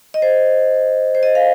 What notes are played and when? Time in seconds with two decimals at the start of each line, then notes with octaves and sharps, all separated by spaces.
0.14 D#5
0.22 C5
1.15 C5
1.23 D#5
1.35 F5